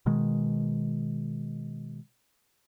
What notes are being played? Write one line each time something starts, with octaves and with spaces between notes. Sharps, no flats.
B2 D#3 G#3